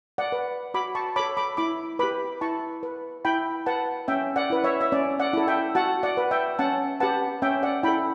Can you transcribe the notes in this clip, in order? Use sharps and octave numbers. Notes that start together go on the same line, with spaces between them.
D5 F#5
B4
F#4 B5 D6
A5 C#6
A4 C#5 B5 D6
B5 D6
E4 B5 D6
G4 B4 B5 D6
E4 A5 C#6
B4
E4 G5 B5
B4 F#5 A5
C#4 E5 G5
D5 F#5
E4 B4
C#5 E5
E5
C#4 D5
D5 F#5
E4 A4
E5 G5
F#4 F#5 A5
D5 F#5
B4
E5 G5
C#4 F#5 A5
G4 B4 F#5 A5
C#4 E5 G5
D5 F#5
E4 A4 G5 B5